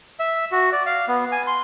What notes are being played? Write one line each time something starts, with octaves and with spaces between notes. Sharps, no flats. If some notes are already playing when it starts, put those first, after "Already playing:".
E5
F#4
D5
F5
B3
G#5
C6